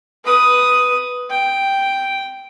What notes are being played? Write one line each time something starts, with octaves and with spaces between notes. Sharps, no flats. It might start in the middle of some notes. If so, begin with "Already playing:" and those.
B4 D#6
G5